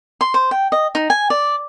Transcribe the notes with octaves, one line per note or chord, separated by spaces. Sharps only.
C6
C5
G5
D#5
D#4
G#5
D5